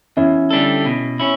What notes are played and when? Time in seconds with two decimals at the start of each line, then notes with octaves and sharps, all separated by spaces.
0.17 E2 C#4 E4
0.51 D3 G3 D4 A4
0.85 B2
1.19 C#4 E4